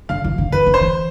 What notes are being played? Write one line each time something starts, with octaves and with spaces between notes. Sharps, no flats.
D3 F5
E3
D3
E3 B4
D3
C5
E3